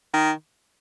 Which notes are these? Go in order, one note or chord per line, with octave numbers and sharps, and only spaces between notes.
D#3